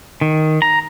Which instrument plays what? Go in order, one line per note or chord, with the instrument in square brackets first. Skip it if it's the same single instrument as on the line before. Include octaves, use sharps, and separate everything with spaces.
[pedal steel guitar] D#3
A#5